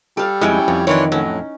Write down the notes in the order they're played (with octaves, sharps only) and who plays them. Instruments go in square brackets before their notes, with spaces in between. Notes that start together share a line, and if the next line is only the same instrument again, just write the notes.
[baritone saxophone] G3 [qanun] A4 F5
[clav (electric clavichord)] F2 G#3 [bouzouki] F#3 C#4 G5 [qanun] E4
[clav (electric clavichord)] F2 [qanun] C#5
[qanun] D#3 D#4 [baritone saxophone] E3 [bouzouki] D4 F4 C#5
[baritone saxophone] A2 [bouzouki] F#3 [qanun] C#4